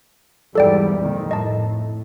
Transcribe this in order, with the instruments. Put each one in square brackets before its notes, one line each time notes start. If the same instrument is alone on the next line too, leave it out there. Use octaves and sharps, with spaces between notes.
[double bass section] E2 G#2 G3 [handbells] A4 D5 G5
[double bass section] F2 A#2 D#3
[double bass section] A2 [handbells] D#5 A5